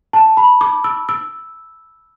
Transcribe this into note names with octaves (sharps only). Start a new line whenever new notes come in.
A5
B5
D6
E6
E6